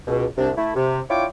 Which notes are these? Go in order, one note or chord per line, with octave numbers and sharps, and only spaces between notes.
C#2 B2
C2 C3 D4
A3 E4
C3
D4 E4 F4 C#5 G5 D6